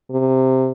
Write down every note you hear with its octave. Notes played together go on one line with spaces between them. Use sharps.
C3